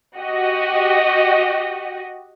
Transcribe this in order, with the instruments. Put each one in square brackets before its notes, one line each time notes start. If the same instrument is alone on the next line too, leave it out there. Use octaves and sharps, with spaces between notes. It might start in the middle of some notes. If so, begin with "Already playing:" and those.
[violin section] F#4 G4 D#5